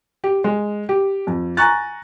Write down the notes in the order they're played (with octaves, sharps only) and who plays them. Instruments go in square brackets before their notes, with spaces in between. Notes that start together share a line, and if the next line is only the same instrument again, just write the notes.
[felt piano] G4
G#3
G4
F2
G#5 A#5 C#6 F#6 A6